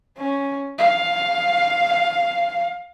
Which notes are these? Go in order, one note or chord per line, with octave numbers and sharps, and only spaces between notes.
C#4
F5